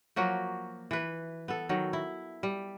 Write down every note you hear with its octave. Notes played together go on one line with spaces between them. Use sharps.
F3 F#3 A#3 F#4
E3 B4
B3 A4
D#3 F#3
E4
G3